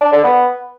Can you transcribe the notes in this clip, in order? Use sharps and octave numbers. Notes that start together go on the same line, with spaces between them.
D4
D3
B3